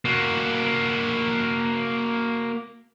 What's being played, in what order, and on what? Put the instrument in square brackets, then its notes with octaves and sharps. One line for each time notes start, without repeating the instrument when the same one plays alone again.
[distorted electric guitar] A#3 F#4